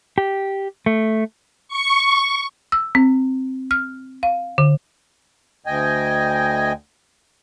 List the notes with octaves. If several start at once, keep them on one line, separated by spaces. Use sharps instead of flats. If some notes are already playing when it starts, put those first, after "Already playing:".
G4
A3
C#6
E6
C4
F6
F5
D3
D2 D#5 G5 G#5